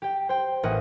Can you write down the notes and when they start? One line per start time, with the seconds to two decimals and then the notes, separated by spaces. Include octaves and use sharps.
0.02 G4 G5
0.29 C5 G5
0.63 A1 A#3 D#5 F#5